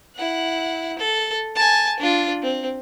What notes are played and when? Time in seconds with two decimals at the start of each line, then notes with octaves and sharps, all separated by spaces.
0.15 E4 F#5
0.99 A4
1.56 G#5 A5
1.99 D4 F4
2.42 C4